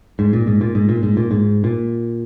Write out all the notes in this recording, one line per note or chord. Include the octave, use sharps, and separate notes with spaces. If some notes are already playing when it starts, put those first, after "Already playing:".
G#2
A#2
G#2
A#2
G#2
A#2
G#2
A#2
G#2
A#2